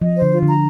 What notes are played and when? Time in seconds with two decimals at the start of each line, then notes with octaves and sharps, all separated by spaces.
0.02 F3 D#5
0.16 C5
0.22 D3
0.32 F4
0.43 D3
0.48 A#5